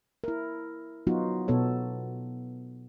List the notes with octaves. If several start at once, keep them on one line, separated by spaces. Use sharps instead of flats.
E4 A#4
F#3 B3 D#4 F4 F#4
B2 B3 A4 C#5